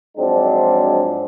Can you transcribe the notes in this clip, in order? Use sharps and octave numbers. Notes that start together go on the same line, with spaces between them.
G#2 F3 F#3 G#3 C4 D4